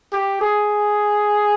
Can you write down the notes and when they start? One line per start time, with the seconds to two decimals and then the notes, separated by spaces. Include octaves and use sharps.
0.12 G4
0.41 G#4